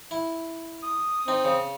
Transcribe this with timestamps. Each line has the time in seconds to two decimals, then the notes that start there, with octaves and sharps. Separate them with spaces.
0.11 E4
0.82 D#6
1.28 C4 D#4
1.45 C#3